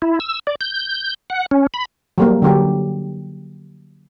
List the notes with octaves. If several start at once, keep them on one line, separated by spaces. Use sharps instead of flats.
E4
E6
D5
G6
F#5
C#4
B5
F#3 G3 A#3
D3 F#3 G4